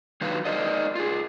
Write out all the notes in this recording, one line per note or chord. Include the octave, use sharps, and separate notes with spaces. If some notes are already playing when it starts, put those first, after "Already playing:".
D#3 F#3 D#4 B4 F5
D#4 A#4 C5 D5 D#5
F4 G#4